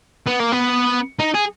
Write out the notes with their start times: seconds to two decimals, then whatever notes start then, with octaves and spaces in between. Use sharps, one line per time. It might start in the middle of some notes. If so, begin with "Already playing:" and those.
0.27 B3
0.39 A#3
0.52 B3
1.19 D#4
1.34 G#4